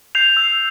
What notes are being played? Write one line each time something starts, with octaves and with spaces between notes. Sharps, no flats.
G6 C7 F7
E6